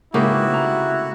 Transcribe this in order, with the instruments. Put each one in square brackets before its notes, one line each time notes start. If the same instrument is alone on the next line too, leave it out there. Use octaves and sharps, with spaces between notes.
[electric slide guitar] G#2 B4 [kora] C#3 A#3 G4 [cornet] E4 [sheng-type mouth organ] F#4
[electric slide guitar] C3 A3 A#5